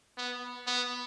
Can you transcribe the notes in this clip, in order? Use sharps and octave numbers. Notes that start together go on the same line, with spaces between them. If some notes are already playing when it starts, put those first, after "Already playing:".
B3
B3